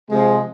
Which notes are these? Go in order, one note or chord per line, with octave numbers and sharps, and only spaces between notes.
C3 F3 G#3